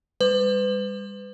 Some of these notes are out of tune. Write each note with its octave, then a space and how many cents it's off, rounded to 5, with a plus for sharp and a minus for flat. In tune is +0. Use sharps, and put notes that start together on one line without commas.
G3 +40 B4 +35